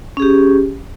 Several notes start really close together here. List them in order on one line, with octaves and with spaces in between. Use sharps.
C#4 G#4 G4